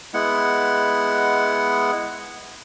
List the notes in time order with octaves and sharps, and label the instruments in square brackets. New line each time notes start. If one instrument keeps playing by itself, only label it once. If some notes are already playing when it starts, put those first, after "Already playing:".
[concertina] G#3 B3 E4 F#5